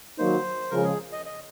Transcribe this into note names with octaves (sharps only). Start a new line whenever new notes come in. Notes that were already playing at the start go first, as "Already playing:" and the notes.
D#3 F#3 A#3 D#4 C5
C#3 F3 G#3 A#4
G#4
D#5
D#5